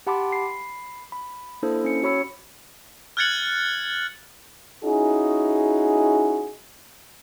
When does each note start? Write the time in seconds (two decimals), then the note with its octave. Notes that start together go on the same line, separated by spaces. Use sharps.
0.07 G4 F#5 A5 B5 C6 D6
0.32 B5 C7
1.12 B5
1.63 A#3 D4 E4 A4 C5
1.84 C#4 C#7
2.03 F#4 C#5 B5 E6 C#7
3.17 F6 F#6 G#6 A6 C#7 F#7
4.84 C#4 D#4 E4 F#4 G#4